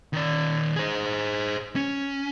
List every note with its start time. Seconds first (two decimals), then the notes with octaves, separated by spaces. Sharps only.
0.13 D#3 D5
0.76 G#4 C5
1.76 C#4